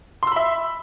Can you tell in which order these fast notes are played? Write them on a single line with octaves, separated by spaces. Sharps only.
C6 E6 B5 E5